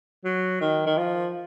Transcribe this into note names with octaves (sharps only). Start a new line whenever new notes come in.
F#3
D#3
D#3
F3